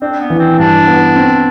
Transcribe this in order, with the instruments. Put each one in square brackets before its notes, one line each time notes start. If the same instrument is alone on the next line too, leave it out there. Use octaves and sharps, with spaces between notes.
[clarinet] C4 [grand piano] D4
[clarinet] B3
[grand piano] E3
[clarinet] C4
[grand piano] G2 [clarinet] D4
[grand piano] B3
C4